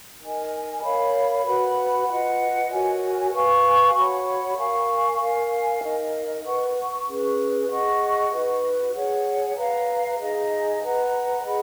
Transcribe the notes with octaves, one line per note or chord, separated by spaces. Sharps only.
D#4 A#4 D#5 G#5
A#4 C#5 F5 B5
F#4 B4 F#5 B5
F4 B4 D#5 F#5
F#4 A#4 C#5 G#5
B4 F5 G#5 C#6
F#4 C#5 F#5 B5
A#4 F5 G#5 C#6
A#4 F5 G#5
D#4 A#4 D#5
B4 F#5 C#6
C#4 G#4 B4
G#4 D#5 F#5 C#6
D#4 F#4 B4
G#4 C#5 F#5
B4 F5 A#5
D#4 G#4 D#5 A#5
B4 F#5 A#5
G#4 D#5 F#5 B5